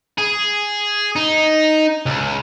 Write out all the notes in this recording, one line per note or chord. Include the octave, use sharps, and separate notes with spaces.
G#4
D#4
C#2